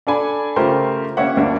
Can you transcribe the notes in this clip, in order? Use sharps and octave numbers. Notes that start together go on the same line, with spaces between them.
D4 A4 D5 G#5 B5
C#3 A3 F4 G4 A#4 C5
A#3 C#4 G4 C#5 E5 F#5
D2 A#3 D4 E5